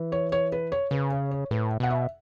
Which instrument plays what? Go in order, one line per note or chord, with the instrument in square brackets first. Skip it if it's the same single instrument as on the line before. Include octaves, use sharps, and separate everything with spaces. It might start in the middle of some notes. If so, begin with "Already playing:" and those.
Already playing: [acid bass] E3
[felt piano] C#5
C#5
B4
C#5
[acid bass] C#3 [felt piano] B4
[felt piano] C#5
C#5
[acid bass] A2 [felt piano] B4
[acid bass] B2 [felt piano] F#5
[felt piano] E5